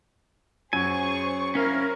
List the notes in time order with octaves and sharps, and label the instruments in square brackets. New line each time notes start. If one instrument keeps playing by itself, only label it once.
[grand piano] F#2 [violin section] G#4 C5 C#6 [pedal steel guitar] G#5
[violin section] C4 E4 C#5 [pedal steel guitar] C#4 F5 [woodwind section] A#4